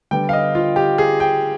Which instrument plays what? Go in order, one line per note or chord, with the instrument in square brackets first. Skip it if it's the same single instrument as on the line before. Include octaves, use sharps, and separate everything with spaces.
[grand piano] D3 G3 B3 G5
F5
D#5
F4
G4
G#4
G5